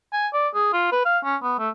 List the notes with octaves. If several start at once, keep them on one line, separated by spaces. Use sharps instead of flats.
G#5
D5
G#4
F4
B4
F5
C#4
B3
A3